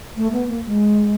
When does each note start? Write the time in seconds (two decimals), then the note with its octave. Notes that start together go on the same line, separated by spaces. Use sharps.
0.16 A3
0.32 B3
0.49 A#3
0.66 G#3